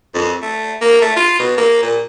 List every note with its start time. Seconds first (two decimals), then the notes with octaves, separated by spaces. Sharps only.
0.15 F2
0.42 A3
0.81 A#3
1.01 A3
1.17 F4
1.39 B2
1.57 A#3
1.83 A#2